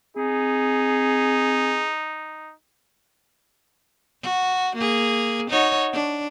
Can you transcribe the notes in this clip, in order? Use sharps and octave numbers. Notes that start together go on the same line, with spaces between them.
C4 D#4 G#4
F#4
A#3 G#4
D#4 F#4 C#5
D4